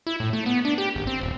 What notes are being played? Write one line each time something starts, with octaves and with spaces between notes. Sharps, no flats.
E4
A2
A3
B3
D4
G4
G#1
C4
D#1